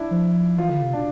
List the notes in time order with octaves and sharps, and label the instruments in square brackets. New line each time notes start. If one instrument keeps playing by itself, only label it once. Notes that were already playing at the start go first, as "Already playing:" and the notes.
Already playing: [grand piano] D4 E4
[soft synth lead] F3
[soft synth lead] E3 [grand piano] F4
[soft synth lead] D3 [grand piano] F4
[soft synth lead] C3
[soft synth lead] B2 [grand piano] D4